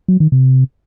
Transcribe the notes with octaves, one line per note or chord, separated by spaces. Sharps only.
F#3
D#3
C3